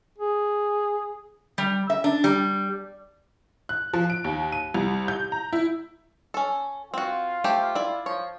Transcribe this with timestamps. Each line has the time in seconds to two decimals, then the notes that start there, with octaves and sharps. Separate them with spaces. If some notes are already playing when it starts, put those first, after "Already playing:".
0.18 G#4
1.58 G3
1.90 E5
2.04 D4
2.24 G3
3.69 F#6
3.93 F3
4.10 D7
4.24 D#2
4.52 D#7
4.74 C2
5.08 G6
5.32 A#5
5.53 E4
6.34 C#4 A4
6.94 C4 F4 F#4
7.44 A3 G4 C5
7.75 E4 D5
8.06 F3 C#5